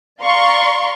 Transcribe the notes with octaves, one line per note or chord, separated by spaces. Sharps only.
D5 F5 A#5 C6 C#6